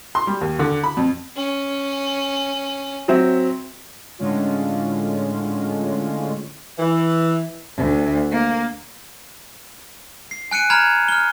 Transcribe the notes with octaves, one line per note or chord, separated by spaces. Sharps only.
C6
G3
D#2
D3
B5
F2
C#4
F#3 C4 E5
A2 D3 G#3 C#4 F4
E3
D2
A#3
C7
G#5 F#6 C#7 D#7
A#5 B5 F6 G#6
F6 G7